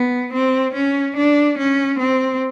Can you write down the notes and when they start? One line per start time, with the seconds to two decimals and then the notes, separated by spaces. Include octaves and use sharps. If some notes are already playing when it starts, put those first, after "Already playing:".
Already playing: B3
0.33 C4
0.74 C#4
1.17 D4
1.58 C#4
1.99 C4